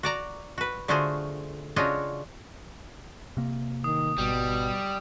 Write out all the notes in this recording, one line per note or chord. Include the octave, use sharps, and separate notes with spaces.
F#4 D5 A#5
F#4 B4
D3 A3 F4 F#4 G#4 C5
C#3 D4 F4 F#4 C#5 D#5
C3 A#3
D#3 D#6
G#1 B2 G3